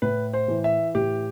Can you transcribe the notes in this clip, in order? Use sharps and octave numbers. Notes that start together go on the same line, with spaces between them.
A2 B4
C5
E3
E5
A2 G4